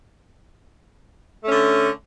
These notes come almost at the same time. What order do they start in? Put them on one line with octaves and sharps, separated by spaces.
A3 C#4 D3